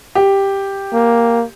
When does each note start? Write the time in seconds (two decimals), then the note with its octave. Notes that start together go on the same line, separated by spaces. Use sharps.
0.15 G4
0.93 A#3